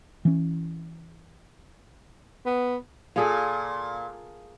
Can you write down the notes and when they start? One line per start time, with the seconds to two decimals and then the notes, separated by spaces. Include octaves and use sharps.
0.25 E3 C#4
2.46 B3
3.16 A#2 F4 G#4 A4